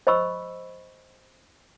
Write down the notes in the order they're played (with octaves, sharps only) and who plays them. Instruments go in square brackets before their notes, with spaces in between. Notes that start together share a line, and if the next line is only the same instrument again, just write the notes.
[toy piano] C5 D#5 B5 C#6 E6